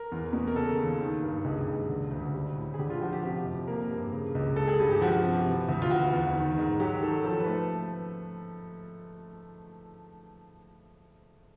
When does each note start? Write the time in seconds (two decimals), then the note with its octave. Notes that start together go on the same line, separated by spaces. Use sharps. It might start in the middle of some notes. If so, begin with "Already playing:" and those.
Already playing: A#4
0.12 E2
0.33 B2
0.48 A#4
0.55 C#3 A4
0.78 D#2
1.00 D#3
1.23 G2
1.44 C#2 G#4
1.68 C#2
1.89 D3
2.11 D2
2.34 G3
2.57 A2
2.74 G#4
2.79 D3 G4
2.90 F4
3.01 F3 F#4
3.13 G4
3.23 C3
3.45 F2
3.67 A#3 A#4
3.91 G2
4.13 C#3
4.35 C#2
4.56 G#3 A4
4.68 G#4
4.80 G2 G4
4.91 G4
5.01 F3 F#4
5.24 C3
5.47 E3
5.69 D2
5.82 F4
5.91 E3 F#4
6.13 E2
6.36 D#3
6.58 G#2
6.80 F#3 G4
7.02 D#3 A4
7.24 F3 A4
7.40 B4
7.46 A3